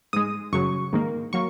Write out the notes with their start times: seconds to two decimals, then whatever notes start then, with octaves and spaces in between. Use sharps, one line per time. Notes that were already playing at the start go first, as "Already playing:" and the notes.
0.13 G#2 G#3 D#6
0.52 F#2 C#3 F#3 C#6
0.93 G#2 D#3 A#3
1.33 F#3 A#3 C#6